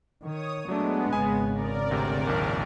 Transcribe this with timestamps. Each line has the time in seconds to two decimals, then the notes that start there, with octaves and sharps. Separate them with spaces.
0.23 D#3 C#5 D#6
0.68 F#3 G#3 A3 B3 D4
1.13 G#1 C#3 G#5 D#6
1.51 A#4 D5
1.91 D2 C3
2.27 A#1 D#2